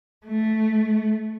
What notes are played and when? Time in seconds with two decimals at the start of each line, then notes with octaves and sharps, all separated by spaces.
0.27 A3